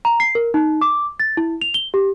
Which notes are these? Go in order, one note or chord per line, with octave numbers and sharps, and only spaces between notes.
A#5
C7
A#4
D#4
D6
A6
E4
F7
G7
G4